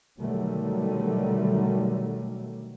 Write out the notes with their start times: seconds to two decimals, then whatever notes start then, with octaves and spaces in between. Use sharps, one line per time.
0.18 B2 D3 D#3 F#3 G3 A3